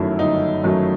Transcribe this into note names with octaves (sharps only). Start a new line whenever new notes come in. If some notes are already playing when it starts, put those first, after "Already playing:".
Already playing: G1 F#2 D#3 F#3 A3 E4
G1 D#4
F#2 D#3 F#3 A3